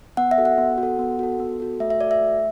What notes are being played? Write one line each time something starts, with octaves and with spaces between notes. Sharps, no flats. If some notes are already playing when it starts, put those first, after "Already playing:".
B3 F#5
E5
F#4 A4
F#5
B3
F#4
A4
B3
F#4 A4
B3
F#4 A4
A3 E5
E5
F#4 A4 D5
E5
A3